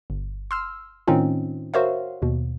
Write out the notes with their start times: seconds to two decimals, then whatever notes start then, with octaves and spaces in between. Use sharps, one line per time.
0.10 G1
0.51 C6 E6 F6
1.07 A2 D#3 C4 C#4 D#4 F4
1.74 F#4 A#4 C5 C#5 E5 F5
2.22 D#2 B2